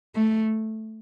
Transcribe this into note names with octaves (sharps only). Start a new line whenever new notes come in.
A3